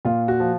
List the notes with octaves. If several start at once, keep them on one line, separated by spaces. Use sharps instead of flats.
A#2 F4
F#4
F3